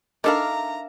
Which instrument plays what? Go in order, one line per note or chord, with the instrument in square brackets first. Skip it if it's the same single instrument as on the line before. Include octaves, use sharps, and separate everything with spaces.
[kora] D4 [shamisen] D#4 A4 B5 [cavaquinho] A#4 E5 F5 [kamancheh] A#5